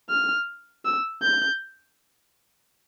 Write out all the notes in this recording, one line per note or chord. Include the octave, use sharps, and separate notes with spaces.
F6
E6
G6